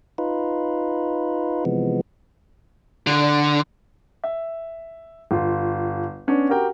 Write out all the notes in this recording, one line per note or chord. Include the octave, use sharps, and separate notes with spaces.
D#4 F4 B4
C3 E3 F3 G#3 B3
D3
E5
G1 F4
B3 C#4 D4
F#4 G4 A#4 G5